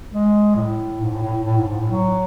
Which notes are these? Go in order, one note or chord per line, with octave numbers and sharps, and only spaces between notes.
G#3
A2
G#2
A2
A2
A2
G#2
G#2
A2
F#3